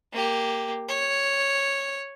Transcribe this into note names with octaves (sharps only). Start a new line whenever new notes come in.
A#3 G4
C#5